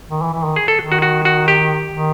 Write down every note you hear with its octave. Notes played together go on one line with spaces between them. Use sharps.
D#3
E3
E3
D#3
G#4
A4
D#3
F#4
F#4
F#4
G4
D#3